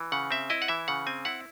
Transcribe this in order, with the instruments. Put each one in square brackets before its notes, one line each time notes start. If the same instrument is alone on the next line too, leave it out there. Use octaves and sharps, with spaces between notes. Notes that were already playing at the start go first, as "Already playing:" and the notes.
Already playing: [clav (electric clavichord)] E3
C#3 F#5
C4 E5
E4 D#5
F#5
E3 E5
C#3 F#5
C4 G#5
E4 F#5